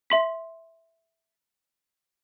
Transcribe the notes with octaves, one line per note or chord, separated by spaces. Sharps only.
E5 C6 B6